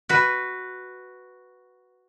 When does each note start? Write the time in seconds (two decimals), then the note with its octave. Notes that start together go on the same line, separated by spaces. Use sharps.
0.09 F#4 B4